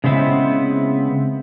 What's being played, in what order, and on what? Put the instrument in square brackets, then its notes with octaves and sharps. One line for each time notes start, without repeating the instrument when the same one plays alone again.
[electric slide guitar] C#3 G#3 B3 C4 E4